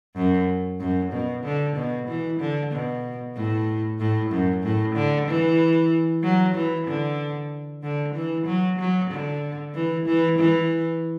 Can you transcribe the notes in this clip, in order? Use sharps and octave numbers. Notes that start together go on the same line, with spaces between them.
F#2
F#2
B2
D3
B2
E3
D3
B2
A2
A2
F#2
A2
D3
E3
F#3
E3
D3
D3
E3
F#3
F#3
D3
E3
E3
E3